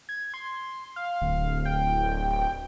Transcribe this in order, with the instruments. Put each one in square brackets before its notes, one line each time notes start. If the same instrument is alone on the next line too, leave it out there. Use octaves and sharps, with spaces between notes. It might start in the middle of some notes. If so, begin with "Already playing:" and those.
[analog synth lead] G#6
C6
F5
[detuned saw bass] D1
[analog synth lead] G5